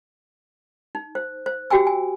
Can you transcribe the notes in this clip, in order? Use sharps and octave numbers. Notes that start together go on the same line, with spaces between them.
D#4
C5
C5
F#4 G4 G5 G#5 E6
G#5